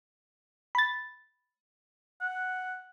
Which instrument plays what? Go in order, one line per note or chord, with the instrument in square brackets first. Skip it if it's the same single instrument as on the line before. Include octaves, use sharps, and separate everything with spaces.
[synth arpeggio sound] B5 A6
[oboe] F#5